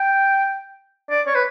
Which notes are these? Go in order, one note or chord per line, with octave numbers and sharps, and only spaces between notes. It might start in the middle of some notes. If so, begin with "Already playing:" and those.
Already playing: G5
D5
C#5
B4